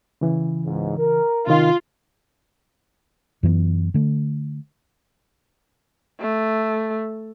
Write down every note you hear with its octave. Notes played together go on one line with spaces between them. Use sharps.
C#3 E3
C#2 G#2
A#4
C3 D#3 F4
F#2 E3 B3
D3 A3
A3